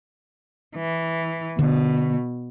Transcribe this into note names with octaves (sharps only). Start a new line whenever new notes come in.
E3
B2 D3